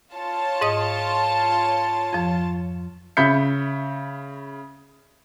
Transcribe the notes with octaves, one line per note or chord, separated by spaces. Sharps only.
F4 C#5 A5
G#2 D#5 D#6
F2 F3
C#3 E5 B5 G6 B6 C#7